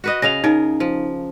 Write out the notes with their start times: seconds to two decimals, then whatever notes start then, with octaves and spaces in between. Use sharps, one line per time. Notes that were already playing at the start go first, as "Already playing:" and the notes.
0.04 F#4 B4 D#5
0.22 C#3 D#5 F5 A#6 F7
0.44 C#3 D#4 A#4
0.80 F3